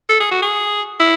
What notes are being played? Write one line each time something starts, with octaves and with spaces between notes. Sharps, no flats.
A4
G#4
F#4
G#4
E4